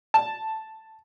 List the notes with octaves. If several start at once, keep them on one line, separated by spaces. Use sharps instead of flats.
A5